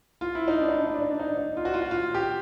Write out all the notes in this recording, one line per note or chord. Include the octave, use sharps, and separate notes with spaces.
F4
E4
D#4
D4
D#4
D4
D#4
D4
D#4
D4
D#4
D4
D#4
F4
F#4
F4
F#4
F4
G4